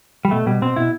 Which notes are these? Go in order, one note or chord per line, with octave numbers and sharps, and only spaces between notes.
G3
B2 A3
B2 G3
B2 C4
B2 E4